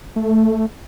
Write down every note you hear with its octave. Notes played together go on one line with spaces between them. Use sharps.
A3